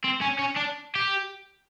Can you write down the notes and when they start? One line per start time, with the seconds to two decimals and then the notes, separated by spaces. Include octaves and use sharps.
0.04 C4
0.21 C#4
0.39 C#4
0.56 D4
0.95 G4